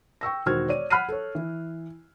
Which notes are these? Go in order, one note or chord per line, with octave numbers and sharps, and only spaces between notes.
G5 C#6 E6 A#6
E1 D#3 F#4 C5 F6 G#6
C#5 D5 D#7
F#5 B5 F6 F#6 C7 D#7
A4 C#5
E3